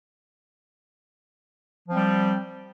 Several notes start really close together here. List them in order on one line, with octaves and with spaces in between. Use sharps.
F3 C4 G3